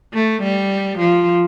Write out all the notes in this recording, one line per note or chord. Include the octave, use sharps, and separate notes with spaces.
A3
G3
F3